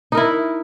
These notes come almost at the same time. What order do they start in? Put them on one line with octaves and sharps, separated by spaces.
D#4 A#4 E4